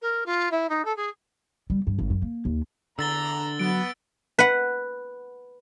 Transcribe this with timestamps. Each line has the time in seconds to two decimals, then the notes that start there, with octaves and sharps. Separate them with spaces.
0.01 A#4
0.26 F4
0.51 E4
0.69 D#4
0.85 A4
0.96 G#4
1.70 G3
1.87 G2
1.99 G#1
2.10 F#2
2.22 A#3
2.45 D#2
2.99 E2 D3 A#5 E6 A6 G7
3.59 F#3 B3 D7
4.39 B4 F#5